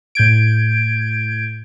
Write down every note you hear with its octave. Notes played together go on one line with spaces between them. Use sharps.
A2 G6 G#6 D7